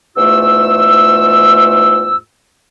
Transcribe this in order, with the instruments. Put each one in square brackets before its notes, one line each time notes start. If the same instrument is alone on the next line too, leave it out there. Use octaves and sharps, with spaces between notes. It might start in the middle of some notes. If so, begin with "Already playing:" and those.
[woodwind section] E2 G#2 A3 F4 E6